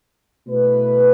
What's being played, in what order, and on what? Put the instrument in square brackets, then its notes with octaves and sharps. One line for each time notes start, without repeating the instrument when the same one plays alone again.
[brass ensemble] B2 A3 E4 B4